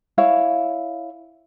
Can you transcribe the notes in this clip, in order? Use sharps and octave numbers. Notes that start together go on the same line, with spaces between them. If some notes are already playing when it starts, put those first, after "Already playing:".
E4 C#5 F5